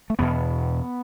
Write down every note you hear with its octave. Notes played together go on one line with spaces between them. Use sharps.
A3
E2 B2 B3